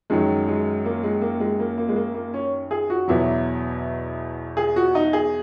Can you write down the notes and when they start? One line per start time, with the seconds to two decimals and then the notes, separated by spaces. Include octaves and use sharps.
0.10 F#2 D#3 F#3 G#3
0.48 G#3
0.85 A#3
1.03 G#3
1.21 A#3
1.40 G#3
1.60 A#3
1.78 A#3
1.89 G#3
1.96 A#3
2.15 A#3
2.34 C#4
2.71 G#4
2.90 F#4
3.08 E2 B2 F#3 E4
4.57 G#4
4.76 F#4
4.95 D#4
5.13 G#4